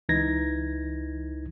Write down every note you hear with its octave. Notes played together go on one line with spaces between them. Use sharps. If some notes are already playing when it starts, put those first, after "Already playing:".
C#2 E3 D#4 G#6 A#6